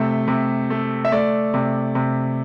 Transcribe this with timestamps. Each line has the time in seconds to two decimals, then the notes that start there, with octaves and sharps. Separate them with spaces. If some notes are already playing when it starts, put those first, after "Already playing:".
Already playing: C3 A3 E5
0.28 C3
0.70 A3
1.05 E5
1.12 A3 D5
1.54 C3
1.95 C3